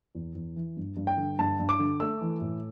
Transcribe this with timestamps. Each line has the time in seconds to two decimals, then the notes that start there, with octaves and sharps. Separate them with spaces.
0.15 E2
0.35 E2
0.56 E3
0.77 G2
0.97 G2
1.07 G5
1.17 D3
1.39 G2 A5
1.59 G2
1.69 D6
1.79 D3
2.00 A3 E6
2.21 E3
2.41 A2